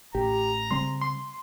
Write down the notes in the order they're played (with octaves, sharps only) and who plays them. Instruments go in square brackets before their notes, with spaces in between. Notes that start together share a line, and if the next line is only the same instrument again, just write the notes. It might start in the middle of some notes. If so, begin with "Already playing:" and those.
[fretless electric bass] A1 [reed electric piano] G4 [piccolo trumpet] A#5
[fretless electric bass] C#3 G3 C4 [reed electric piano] C6
[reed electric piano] C6